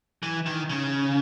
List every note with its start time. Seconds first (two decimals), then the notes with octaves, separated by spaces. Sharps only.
0.23 E3
0.46 D#3
0.70 C#3